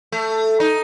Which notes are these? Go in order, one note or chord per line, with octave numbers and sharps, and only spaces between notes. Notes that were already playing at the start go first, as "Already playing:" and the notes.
A3
D#4